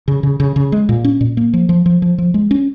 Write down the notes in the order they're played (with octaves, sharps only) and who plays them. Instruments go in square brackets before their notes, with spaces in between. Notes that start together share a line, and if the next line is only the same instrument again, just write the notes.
[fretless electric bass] C#3
C#3
C#3
C#3
G#3
A#2
C#4
A#2
A#3
F3
F3
F3
F3
F3
G#3
C#4